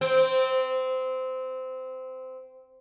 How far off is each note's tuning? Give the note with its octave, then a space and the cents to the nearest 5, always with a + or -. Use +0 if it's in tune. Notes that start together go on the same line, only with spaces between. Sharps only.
C4 -15